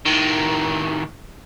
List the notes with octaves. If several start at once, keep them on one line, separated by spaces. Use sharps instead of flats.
A2 D#3